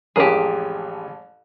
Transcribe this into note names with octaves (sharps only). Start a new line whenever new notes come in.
A1 F2 E3 G#3 C#4 G4 G#4 A#4